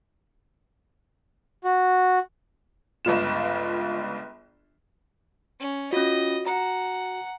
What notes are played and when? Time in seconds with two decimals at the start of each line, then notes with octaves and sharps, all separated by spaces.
1.64 F#4
3.05 G1 C#2 F4 E7
5.60 C#4
5.93 C#4 F4 F#4 D#5
6.46 F#5 A#5